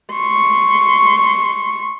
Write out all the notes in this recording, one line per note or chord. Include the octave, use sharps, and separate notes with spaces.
C6 C#6